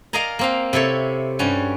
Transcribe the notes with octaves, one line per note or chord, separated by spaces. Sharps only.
A#4 D5 D#5 F5 G#5 A#5
A#3 C4 F5
C3 E4 A4 C#5
G2 G3 C#4 F#4